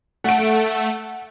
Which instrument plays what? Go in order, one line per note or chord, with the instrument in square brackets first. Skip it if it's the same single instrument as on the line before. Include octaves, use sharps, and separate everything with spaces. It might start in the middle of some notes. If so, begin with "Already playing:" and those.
[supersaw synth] A3 [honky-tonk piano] F#5 D7